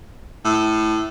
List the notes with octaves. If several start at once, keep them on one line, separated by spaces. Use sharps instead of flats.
A2